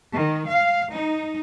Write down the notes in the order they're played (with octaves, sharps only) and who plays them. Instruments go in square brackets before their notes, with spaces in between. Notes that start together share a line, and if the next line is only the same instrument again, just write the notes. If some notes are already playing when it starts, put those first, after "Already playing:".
[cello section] D#3
F5
D#4